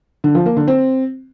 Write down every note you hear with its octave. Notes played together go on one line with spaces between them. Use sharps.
D3
F3
A#3
D3
C4